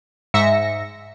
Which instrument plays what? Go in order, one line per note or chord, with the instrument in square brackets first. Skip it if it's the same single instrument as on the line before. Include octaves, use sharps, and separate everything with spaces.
[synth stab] G#2 E5 A#6 C#7